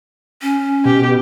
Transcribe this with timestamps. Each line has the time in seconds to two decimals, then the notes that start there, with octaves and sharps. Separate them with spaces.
0.42 C#4
0.85 B2 G4